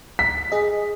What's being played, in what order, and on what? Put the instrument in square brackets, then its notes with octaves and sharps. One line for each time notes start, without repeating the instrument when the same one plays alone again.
[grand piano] B6
[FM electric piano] G#4 D#5